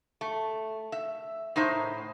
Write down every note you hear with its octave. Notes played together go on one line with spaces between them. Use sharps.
A3
E5
A2 D#4 C5 E5